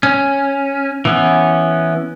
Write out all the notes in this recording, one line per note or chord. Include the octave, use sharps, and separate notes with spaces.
C#4
E3 B3 C#4